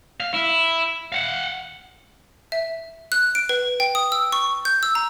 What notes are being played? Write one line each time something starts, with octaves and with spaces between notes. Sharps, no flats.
F5
E4
F5 F#5
E5
F#6
D7
B4
G5
D#6
E6
C#6
G6
E6
A#5